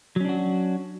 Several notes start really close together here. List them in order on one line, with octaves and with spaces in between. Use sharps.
F#3 C#4 D4 F#4